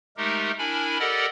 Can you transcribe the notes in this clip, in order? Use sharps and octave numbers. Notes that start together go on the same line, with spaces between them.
G#3 A3 D#4 G4 A#4
D4 E4 A#4 G#5 B5
G4 A4 A#4 D5 D#5 F#5